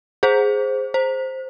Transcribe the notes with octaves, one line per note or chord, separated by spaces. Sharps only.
G#4 C5
C5